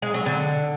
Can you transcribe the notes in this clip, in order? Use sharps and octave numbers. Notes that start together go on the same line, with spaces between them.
G#3
F#3
D3